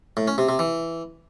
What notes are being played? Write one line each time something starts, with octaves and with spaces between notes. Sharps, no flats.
A2
C#4
C3
C3
E3